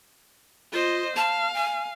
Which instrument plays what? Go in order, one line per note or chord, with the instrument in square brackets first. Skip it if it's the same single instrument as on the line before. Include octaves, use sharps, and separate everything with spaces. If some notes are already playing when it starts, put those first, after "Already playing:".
[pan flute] F4 [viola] C5 D#5
[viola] F5 [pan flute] A5
[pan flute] G#5